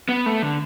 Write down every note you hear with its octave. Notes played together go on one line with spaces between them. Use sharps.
B3
A3
D3